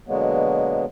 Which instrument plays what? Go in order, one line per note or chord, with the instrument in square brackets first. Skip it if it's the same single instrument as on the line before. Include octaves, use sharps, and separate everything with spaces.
[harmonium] B2 D3 F#3 G#3 A#3 B3